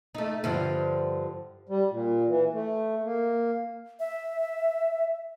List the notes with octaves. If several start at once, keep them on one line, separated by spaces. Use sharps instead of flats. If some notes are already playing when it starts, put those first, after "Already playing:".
A3 D#4
G2 D3 F3
G3
A#2
E3
A3
A#3
E5